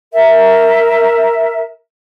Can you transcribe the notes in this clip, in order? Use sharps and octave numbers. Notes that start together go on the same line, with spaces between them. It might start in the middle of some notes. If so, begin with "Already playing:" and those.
A#4 E5